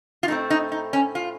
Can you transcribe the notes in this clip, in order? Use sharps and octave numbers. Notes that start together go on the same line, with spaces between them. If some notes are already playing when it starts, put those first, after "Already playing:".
F4
A2 A3 C4 D#4
D#4
D#4
C#4
F4